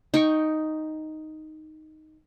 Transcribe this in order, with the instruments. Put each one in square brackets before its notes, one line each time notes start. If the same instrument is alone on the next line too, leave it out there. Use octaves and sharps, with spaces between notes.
[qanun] D#4 G5 C#6